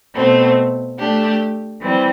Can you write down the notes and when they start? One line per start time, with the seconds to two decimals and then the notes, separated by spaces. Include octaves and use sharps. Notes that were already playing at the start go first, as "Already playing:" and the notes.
0.14 B2 A3 C4
0.98 A3 D4 G4
1.81 E3 G3 C4